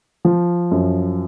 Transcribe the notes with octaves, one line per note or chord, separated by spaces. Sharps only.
F3
F#2